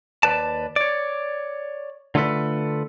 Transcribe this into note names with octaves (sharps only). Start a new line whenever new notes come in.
D#2 B4 D5 A5
C#5 D5
D3 A3 F4 A4 B4